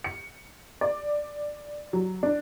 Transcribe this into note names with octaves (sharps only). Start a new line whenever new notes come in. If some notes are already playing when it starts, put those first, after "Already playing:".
C#7
D5
F#3
D4